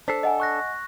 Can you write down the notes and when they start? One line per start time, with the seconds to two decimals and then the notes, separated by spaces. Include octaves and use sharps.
0.08 D4 A4 C5 B6 C7
0.23 D#5 F#5 G#5
0.40 C#6 F#6 A#6